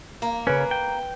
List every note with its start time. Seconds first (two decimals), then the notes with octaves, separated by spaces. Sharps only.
0.22 A#3
0.47 C#3 C#4 B4 D7
0.71 G5